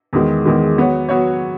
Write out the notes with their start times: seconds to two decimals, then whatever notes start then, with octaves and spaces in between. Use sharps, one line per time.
0.13 E2 D#3 G#3
0.45 E2 D#3 G#3
0.77 F#3 B3 F#4 C#5
1.09 F#3 B3 F#4 C#5